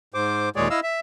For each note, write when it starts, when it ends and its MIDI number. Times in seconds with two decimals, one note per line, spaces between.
0.14 0.49 44
0.14 0.49 72
0.14 0.49 86
0.56 0.68 39
0.56 0.68 46
0.56 0.68 56
0.56 0.68 68
0.56 0.68 73
0.56 0.68 74
0.70 0.80 64
0.70 0.80 75
0.70 0.80 77
0.70 0.80 88
0.83 1.00 76